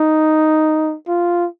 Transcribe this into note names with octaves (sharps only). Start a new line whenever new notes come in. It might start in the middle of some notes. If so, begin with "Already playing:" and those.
Already playing: D#4
F4